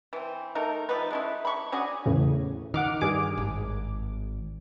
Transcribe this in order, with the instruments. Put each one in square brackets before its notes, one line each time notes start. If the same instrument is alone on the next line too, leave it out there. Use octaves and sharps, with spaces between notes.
[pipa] E3 C4
A3 D#4 A#4
F3 A3 D#4 B4
G#3 C#4 E4
B5 C#6
C#4 D4 F#4 G#4
[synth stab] E2 A2 C#3
[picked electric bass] D#3 [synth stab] F#5 D6 F6
[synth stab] G2 G#4 D6
[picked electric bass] G#1